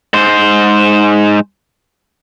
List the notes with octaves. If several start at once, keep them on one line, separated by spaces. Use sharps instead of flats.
G#2 C5